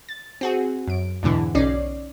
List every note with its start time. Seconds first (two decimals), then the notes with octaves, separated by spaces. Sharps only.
0.09 A6
0.41 C4 F#4 G#4
0.88 F#2 D7
1.23 E2 G#2 B2 D3 E3
1.55 B1 C#4 D#4 D5 C7